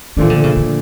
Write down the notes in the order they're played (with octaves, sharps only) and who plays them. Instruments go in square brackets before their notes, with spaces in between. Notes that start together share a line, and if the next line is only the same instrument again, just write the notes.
[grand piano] A#2 F3 A3 D4 [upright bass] D#3
[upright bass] D3
C#3
D3